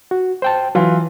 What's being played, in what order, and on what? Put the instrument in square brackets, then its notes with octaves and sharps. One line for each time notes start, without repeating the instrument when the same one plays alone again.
[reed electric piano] F#4
C5 G5 A5
[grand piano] E3 F4 [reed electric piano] F#3